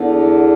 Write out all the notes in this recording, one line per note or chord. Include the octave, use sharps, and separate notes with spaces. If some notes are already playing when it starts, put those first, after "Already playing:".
Already playing: E2 D3